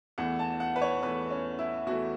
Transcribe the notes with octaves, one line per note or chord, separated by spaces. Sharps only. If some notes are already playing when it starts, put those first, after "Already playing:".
E2 E3 A3 F#5
A5
F#5
B4
C#5
E2 E3 A3 B4
C#4
E4
E2 E3 A3 F#4